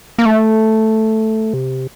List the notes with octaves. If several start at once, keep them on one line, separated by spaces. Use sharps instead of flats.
A#3
A3
C3